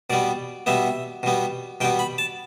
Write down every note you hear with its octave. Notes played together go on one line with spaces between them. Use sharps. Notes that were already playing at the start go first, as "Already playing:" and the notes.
B2 G3 B3 D5
B2 G3 B3 E5
B2 G3 B3
B2 G3 B3 G5
B5
A5